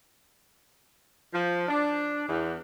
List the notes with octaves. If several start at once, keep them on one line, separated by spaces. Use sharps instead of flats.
F3
D4
E2